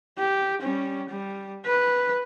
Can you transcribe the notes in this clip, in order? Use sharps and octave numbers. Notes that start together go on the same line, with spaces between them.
G4
G3 C#4
G3
B4